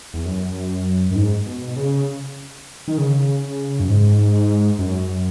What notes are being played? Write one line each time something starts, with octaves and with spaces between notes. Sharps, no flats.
E2
F#2
F#2
G#2
B2
C#3
D#3
C#3
F#2
G#2
F#2